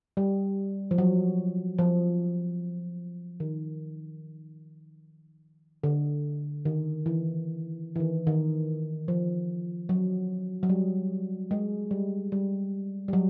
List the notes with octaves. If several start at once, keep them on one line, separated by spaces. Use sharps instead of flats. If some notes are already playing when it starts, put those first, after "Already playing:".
G3
F3
F#3
F3
D#3
D3
D#3
E3
E3
D#3
D#3
F3
F#3
F#3
G3
G#3
G3
G3
G3
F#3